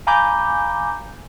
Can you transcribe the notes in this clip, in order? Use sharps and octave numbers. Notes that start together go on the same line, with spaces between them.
F5 G#5 A#5 B5 D6 G6